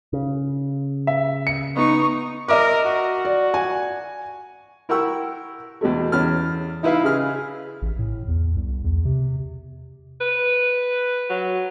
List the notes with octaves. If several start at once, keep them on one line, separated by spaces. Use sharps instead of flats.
C#3
E5
C#7
B3 D#4 C#6
A#4 D#5 E5 D6
F#4
D5
G#5
E4 A#4 F#5 G5 C#6 E6
E2 B2 G#3 A3
E2 C#4 F6
D#4 E4 B4 E5 F5
C#3 G#4 F6
A1
A2
E2
C2
E2
C3
B4
F#3